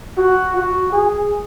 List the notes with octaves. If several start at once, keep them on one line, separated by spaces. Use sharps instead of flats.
F#4
F#4
G#4